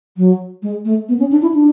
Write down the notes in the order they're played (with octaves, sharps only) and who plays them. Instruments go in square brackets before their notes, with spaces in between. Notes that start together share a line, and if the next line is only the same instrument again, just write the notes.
[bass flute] F#3
G#3
A3
B3
C#4
D4
E4
D4